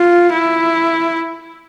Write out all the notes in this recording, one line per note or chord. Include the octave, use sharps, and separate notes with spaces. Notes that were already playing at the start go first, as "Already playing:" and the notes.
Already playing: F4
E4